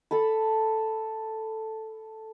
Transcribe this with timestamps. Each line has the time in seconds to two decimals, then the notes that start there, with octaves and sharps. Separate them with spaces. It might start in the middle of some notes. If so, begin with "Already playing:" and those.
0.11 A4 A5 B5